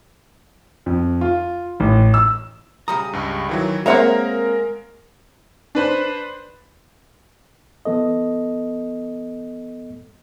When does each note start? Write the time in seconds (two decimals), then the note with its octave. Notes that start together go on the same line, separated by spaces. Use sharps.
0.86 F2
1.21 F4
1.80 A1
2.14 E6
2.88 C#3 G3 A#5 D#6
3.13 C#2 G2
3.49 D#3 E3 F#3
3.86 G#3 A#3 C4 A#4 C#5 E5 F#5 A#5
5.75 D4 B4 C5
7.85 E3 B3 A4 D#5